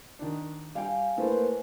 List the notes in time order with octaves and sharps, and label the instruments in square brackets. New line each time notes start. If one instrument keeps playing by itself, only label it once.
[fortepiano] D#3 D4
[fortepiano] G3 G5 [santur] F5 G#5
[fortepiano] A3 E4 [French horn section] A#3 B4 C5